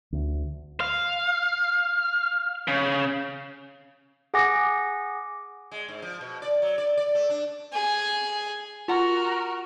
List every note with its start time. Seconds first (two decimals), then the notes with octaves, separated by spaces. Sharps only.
0.12 D2
0.81 F5
2.68 C#3
4.34 G#4 F#5 G#5 D6 A#6
5.71 G#3
5.88 G#2
6.02 F3
6.21 B2
6.42 D5
6.62 F#3
6.78 D5
6.97 D5
7.15 A3
7.30 D4
7.73 G#4 G#5
8.88 F4 F#4 A#4 F#5